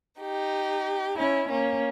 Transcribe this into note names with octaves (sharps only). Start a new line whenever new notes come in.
D#4 G4
C#4 E4
A#3 C#4